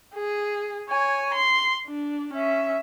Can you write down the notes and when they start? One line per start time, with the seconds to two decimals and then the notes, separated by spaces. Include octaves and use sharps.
0.15 G#4
0.89 C#5 G#5
1.34 C6
1.87 D4
2.33 C#4 E5